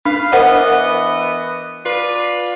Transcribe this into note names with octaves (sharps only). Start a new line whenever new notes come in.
D4 B4 F5
E3 B3 A#4 C5 D#5 F#5
D4 F4 B4